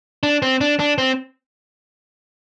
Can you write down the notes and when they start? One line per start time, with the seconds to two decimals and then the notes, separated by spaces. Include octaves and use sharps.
0.23 D4
0.42 C4
0.61 D4
0.79 D4
0.98 C4